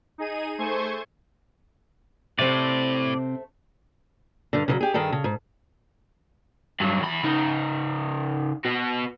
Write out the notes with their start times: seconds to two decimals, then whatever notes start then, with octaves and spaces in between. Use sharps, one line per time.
0.18 D#4 G#4 D#7
0.58 A3 C5 G#5 C#6 G#6
2.39 A2 C3 A3 C4 C5 D5
4.53 G2 D3
4.68 C#3 F3 F#3
4.81 G4 G#4
4.94 G2 D#3 G#4 A4
5.12 C#3
5.24 G#2
6.80 G2 F#3
7.01 E2 B5
7.23 C#3 D#4
8.65 B3 F#4